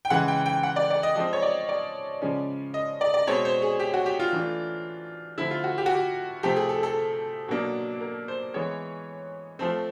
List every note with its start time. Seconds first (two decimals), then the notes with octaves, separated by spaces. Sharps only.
0.05 G5
0.10 C#3 E3 G#3 F#5
0.28 G5
0.46 G5
0.63 F#5
0.76 D5
0.90 D5
1.03 D#5
1.16 F3 G#3 C4 D#5
1.33 C#5
1.42 D5
1.69 D5
2.22 C#3 F3 G#3 C#4
2.74 D#5
3.01 D5
3.14 D5
3.27 B2 G#3 C4 C#5
3.45 C5
3.62 G#4
3.80 G4
3.94 F#4
4.06 G4
4.20 F4
4.32 E3 A3 D4
5.38 D3 F3 A3 C4 E4
5.51 F4
5.64 F#4
5.78 G4
5.86 F#4
5.94 G4
6.43 C3 F3 A3 G4
6.56 G#4
6.69 A4
6.83 A4
7.48 B2 F#3 A#3 D4
8.01 A#4
8.28 C5
8.54 E3 G#3 B3 C#5
9.59 F3 A3 C4